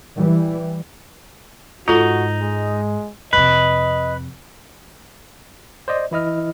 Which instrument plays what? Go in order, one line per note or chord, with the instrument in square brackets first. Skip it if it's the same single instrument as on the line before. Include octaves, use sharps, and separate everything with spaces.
[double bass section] E3 G3
[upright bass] G#2 [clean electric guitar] D#4 [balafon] F4 A4 [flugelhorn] F#4
[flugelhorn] G#3
[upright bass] F2 C3 [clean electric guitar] B4 [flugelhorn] D#5
[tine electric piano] C5 D5 D#5
E3 E4 D#5 F6